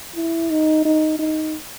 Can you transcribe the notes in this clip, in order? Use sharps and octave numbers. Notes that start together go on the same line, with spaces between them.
E4
D#4
D#4
D#4